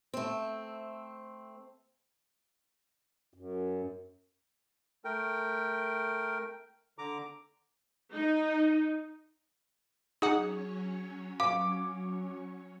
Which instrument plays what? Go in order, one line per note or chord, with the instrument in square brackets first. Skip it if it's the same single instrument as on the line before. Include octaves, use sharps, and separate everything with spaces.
[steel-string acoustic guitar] A3 C4
[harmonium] F#2
[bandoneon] A3 A#4 G5
D3 A#5 D6
[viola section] D#4
[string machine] F#3 C#4 C#5 [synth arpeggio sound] D#4 F#5 [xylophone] G#4
[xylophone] F5 [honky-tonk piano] D6